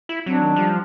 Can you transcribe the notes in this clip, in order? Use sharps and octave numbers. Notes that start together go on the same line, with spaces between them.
E4
F#3 C4 D4
D#3
F3 G3